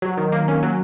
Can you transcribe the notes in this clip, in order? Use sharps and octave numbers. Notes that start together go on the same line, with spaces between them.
F#3
D#3
A#3
C#4
F#3